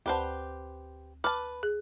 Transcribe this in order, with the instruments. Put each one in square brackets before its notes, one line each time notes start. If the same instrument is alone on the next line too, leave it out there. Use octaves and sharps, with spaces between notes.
[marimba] D2 F#5 A5 [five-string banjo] G4 B4 C5
[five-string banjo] B4 A5 [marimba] D6 F6
[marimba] G#4